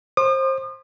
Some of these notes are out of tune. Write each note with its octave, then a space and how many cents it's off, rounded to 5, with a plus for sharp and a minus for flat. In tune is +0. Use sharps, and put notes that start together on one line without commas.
C5 +25 D#6 -40